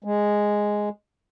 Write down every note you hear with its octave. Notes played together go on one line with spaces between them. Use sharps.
G#3